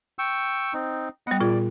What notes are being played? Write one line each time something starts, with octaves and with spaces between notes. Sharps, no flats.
G5 C#6 E6
C4 D#4
G3 B3 D#5 F#5
A#2 F4 G#4 D5